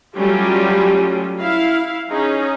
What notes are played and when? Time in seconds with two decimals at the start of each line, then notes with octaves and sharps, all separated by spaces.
0.16 F#3 G3 A3 C#4 F4 G4
1.41 E4 F5
2.10 C#4 D#4 G#4